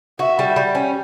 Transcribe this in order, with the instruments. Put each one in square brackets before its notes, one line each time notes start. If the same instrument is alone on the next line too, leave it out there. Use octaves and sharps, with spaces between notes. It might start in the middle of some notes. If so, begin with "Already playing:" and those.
[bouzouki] F#4 [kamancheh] E5
[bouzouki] G3
G3
C#4